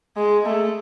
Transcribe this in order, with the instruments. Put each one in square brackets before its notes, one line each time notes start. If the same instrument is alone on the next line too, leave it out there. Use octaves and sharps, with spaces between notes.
[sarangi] G#3
A3